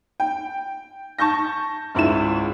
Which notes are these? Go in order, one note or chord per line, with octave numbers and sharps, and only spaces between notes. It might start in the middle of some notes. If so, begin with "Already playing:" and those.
G5
A5 C#6 G6 A#6
G#1 C#2 E4 F4 E7